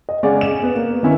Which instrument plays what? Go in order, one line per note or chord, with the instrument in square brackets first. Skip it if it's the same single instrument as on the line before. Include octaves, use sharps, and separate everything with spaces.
[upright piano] D#5
C#3 G#3 C#4 D5 F#5
E7
B3
A#3 B3
D#3 B3 C#4 E4